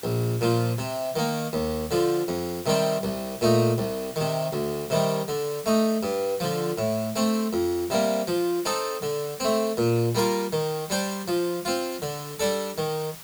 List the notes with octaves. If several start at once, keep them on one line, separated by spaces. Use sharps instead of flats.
A#1
A#2 F3
C3
D#3 A#3
D#2
D3 F3
F2
C3 D#3 G3 C4
C2
A#2 A3 D#4
C2
C3 D#3
D2
C3 D#3 G3
D3
A3 D#4
G2
D3 F3
A2
A3 C4
F2
C3 G3 A#3
F3
C4 D#4 A4
D3
A3 C4
A#2
G3 A#3 F4 A#4
D#3
G3 D4 G4 C5
F3
C4 F4
D3
G3 D4 A4
D#3